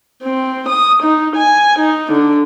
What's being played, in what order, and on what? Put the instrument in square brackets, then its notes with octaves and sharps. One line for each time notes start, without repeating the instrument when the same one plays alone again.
[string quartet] C4
D#6
D#4
G#5
D#4
D3